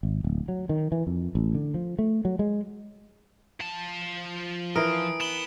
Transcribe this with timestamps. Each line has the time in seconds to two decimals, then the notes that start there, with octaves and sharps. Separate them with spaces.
0.03 G#1
0.24 D1
0.48 F#3
0.69 D#3
0.92 E3
1.07 F2
1.35 A1
1.55 D3
1.74 F3
1.99 A3
2.25 F#3
2.39 G#3
3.60 F3 A5
4.76 E3 A#4 D#6 D7
5.20 B3 B5 E7 G7